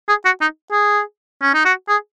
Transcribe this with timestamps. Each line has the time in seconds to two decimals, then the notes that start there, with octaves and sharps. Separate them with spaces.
0.09 G#4
0.25 F#4
0.41 D#4
0.72 G#4
1.42 C#4
1.54 D#4
1.65 F#4
1.89 G#4